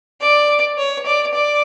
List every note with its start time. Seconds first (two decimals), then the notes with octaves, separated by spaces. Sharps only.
0.21 D5
0.78 C#5
1.06 D5
1.34 D5